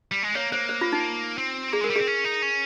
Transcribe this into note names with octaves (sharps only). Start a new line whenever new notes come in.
G3
G#3
A#3 C#5
A#3 C5
C5
F4
D#4
C4
A#3 G#4
G#3 A#4
G3
C4 G#4
C#4
D#4
C#4